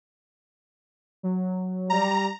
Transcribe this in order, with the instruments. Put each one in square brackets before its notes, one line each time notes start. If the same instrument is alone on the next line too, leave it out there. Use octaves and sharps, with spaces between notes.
[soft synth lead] F#3
[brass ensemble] G3 [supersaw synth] A#5